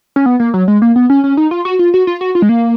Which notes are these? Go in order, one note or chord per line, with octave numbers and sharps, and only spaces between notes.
C#4
B3
A#3
F#3
G#3
A#3
B3
C#4
C#4
D#4
F4
F#4
F4
F#4
F4
F#4
F4
G#3
A#3